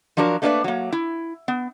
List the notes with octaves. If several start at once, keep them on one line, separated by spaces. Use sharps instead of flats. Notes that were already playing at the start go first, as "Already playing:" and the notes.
F3 F#3 D4 F#4 A#4
A3 A#3 D4 A#4 B4 D5
F#3 A#3
E4
B3